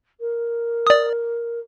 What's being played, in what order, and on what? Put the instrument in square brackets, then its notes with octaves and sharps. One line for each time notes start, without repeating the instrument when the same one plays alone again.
[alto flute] A#4
[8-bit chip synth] D5 D#6